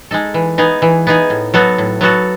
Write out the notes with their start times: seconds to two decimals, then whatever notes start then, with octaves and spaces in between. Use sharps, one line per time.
0.11 G#3 D#4 A4
0.34 E3
0.58 B3 D#4 G#4
0.82 E3
1.07 B3 D#4 G#4
1.30 A2
1.54 F#3 B3 F#4 A4
1.78 A2
2.01 F#3 B3 F#4 A4